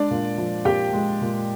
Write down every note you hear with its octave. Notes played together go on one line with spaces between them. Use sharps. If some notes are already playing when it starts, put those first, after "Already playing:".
Already playing: G#3 D4 D5
A#2
F3
A#2 G4 G5
G#3
A#2